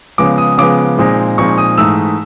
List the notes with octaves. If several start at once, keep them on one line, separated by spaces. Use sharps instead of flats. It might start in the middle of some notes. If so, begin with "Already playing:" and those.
C#3 F3 G#3 B3 D6
D#6
C#3 F3 G#3 B3 D6
A#2 F3 G#3 C4 D#4
A#2 F3 G#3 C4 D#4 C#6
D#6
G#2 E3 A3 E6